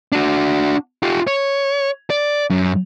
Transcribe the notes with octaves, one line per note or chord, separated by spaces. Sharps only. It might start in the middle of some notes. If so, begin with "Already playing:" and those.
D4 F#4
F4 G4
C#5
D5
F#2